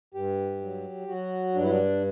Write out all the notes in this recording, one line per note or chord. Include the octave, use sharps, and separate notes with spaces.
G2 G4
F#3
F#3 F#4
G2 D4
E4
D4